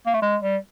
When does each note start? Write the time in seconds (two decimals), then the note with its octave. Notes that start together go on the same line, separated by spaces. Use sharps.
0.06 A#3
0.14 A3
0.22 G#3
0.42 G3